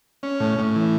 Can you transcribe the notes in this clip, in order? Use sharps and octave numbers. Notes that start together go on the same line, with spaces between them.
C#4
A2
A2
E3